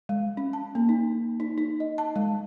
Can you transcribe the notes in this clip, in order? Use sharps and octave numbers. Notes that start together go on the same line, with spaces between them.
G#3
C#4
A5
A#3
D#4
D#4
D#4
D#5
A5
G#3